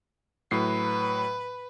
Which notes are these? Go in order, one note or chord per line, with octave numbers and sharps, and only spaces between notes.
A2 F#3 B4 C7